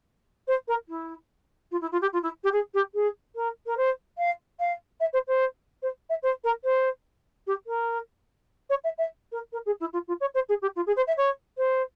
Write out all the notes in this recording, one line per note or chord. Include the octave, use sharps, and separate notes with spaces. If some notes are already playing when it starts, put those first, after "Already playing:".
C5
A#4
E4
F4
E4
F4
G4
F4
E4
G4
G#4
G4
G#4
A#4
A#4
C5
F5
F5
E5
C5
C5
C5
E5
C5
A#4
C5
G4
A#4
C#5
E5
E5
A#4
A#4
G#4
E4
F4
F4
C#5
C5
G#4
G4
F4
G#4
C5
E5
C#5
C5